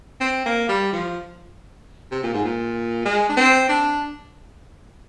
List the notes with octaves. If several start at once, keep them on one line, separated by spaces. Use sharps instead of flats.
C4
A#3
G3
F3
C3
A#2
G#2
A#2
G#3
D4
C4
D4